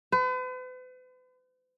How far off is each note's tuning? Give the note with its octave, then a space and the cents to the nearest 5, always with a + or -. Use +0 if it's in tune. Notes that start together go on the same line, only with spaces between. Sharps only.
B4 +45